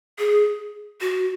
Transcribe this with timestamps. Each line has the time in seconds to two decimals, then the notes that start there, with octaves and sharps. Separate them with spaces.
0.19 G#4
1.01 F#4